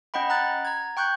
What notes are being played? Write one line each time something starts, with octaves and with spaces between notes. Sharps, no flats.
C#4 D#5 F#5 G5 B5
F#5 A#5 F#6 A6
A#5 G#6
G5 C#6 F#6 G6